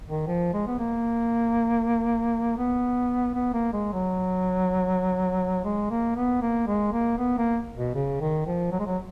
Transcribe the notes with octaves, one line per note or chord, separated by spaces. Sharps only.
D#3
F3
G#3
B3
A#3
B3
B3
A#3
G#3
F#3
G#3
A#3
B3
A#3
G#3
A#3
B3
A#3
B2
C#3
D#3
F3
F#3
G#3
F#3